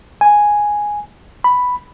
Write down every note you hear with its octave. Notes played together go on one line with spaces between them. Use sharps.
G#5
B5